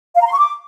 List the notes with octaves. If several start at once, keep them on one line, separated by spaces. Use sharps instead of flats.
F5
A#5
C6
C#6
D6